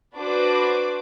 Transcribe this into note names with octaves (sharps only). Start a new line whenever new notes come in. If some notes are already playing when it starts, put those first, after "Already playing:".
D4 F#4 B4 C5 D6